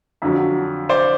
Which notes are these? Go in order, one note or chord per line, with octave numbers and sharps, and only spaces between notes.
F2 D3 F#3
C5 D5